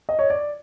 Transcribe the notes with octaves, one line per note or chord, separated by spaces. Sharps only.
D#5
C#5
D5